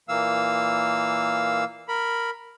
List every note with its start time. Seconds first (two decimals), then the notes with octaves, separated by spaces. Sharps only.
0.09 A#2 E3 A#3 F5 E6
1.89 A#4 B5